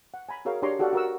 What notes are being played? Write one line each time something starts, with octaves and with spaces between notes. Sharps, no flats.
F#5
G#5 A#5 B5
F#4 G#4 A#4 C#5 F5
D4 G4 C#5 A#5 C6 D6
F#4 G4 A4 D5 F5 F#5
F#4 A#4 F#5 E6